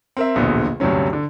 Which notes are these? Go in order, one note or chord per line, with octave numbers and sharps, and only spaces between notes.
C4 A#4 E5
D1 A#1 E2 B2 D3
D2 G2 C3 F#3 C#4
D3